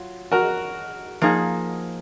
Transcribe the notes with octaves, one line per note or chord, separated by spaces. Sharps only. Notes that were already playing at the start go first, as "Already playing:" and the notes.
Already playing: F#3 F4
F#4 A#4
F3 A#3 D#4 G#4